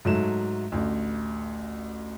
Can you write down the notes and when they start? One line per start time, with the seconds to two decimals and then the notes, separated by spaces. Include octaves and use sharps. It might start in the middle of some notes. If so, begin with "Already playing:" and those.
0.05 G#2 F#3 A3 E7
0.72 A1 D2